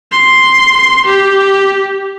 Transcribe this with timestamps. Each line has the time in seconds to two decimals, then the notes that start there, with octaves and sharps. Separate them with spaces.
0.12 C6
1.06 G4